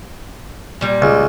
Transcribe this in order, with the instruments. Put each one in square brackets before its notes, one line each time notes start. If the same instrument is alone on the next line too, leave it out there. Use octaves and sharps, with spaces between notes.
[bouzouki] A#2 G3
[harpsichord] C#2